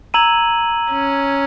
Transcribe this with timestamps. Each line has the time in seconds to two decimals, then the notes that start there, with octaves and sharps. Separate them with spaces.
0.14 A#5 E6 G#6 D#7 F#7
0.92 C#4